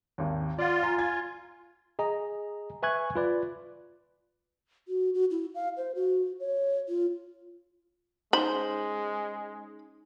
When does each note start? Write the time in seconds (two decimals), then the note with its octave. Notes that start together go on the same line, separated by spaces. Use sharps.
0.18 G#1 D#2
0.58 F4 D5 F#5
0.82 G#5 A#5
0.98 F4 G#5 G#6
1.99 G#4 D#5 A#5
2.83 B4 E5 G#5 C#6 F#6 G#6
3.15 F4 B4 D5
4.88 F#4
5.14 F#4
5.31 E4
5.55 F5
5.77 C5
5.95 F#4
6.40 C#5
6.88 F4
8.33 G#3 C#4 D#4 C5 B5